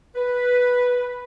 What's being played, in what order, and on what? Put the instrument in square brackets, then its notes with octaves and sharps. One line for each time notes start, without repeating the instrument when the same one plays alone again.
[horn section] B4